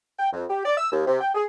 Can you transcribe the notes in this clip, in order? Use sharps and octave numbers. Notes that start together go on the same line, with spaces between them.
G5
F2
G4
D5
E6
D#2
C3
G5
G#4